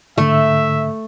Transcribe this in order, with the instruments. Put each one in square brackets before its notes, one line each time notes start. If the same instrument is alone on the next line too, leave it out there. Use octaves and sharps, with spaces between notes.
[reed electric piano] G#2 D3 [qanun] A3 [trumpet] E5